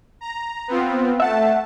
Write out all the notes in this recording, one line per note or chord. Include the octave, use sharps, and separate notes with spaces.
A#5
B3 C4 F4
A3 E5 F#5 A5